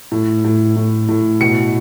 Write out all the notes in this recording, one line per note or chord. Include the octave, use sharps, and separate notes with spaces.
A2
A2
A2
A2
B2 C#7